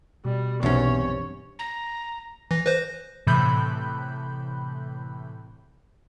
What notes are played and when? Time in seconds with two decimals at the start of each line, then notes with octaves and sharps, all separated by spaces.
0.25 B2 G3
0.63 B1 E2 G2 C3 C#4 C#5
1.59 A#5
2.51 E3 A#6
2.66 B4 C5
3.27 A2 C3 E3 B5 F#6 G6